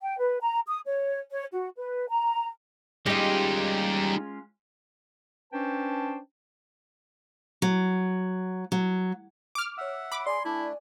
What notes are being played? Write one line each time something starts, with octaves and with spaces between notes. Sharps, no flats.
G5
B4
A#5
D#6
C#5
C#5
F#4
B4
A#5
G3 G#3 C#4 D#4 F4 G4 D#5
C#4 D4 B4 C5 G5 A5
F#3
F#3
D6 F6
C#5 E5 F#5 E6
B5 D6
G#4 D5 G#5 C6
A3 D4 E4